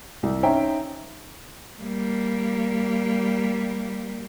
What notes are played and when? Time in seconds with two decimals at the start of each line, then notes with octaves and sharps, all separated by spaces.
0.23 C2
0.43 C#4 D#4 C5 E5 G5 A#5
1.81 G3 A#3